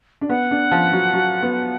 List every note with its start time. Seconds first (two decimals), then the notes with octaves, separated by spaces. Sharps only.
0.21 D4
0.29 B3 F#5
0.51 D4
0.71 F3
0.93 F#3
1.13 F#3
1.42 B3